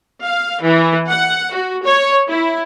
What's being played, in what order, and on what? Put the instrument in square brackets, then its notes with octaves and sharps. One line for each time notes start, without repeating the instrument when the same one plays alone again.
[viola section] F5
E3
F#5
F#4
C#5
E4